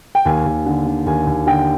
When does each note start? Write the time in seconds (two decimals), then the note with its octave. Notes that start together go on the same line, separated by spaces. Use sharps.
0.15 G5
0.25 D#2 G#5
0.46 D#2
0.66 D3
0.86 D3
1.06 D#2 G#5
1.27 D#2
1.47 D3 G5